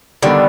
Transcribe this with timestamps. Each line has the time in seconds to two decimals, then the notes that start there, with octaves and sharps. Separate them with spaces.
0.23 D3 D#3 G3 B3 D4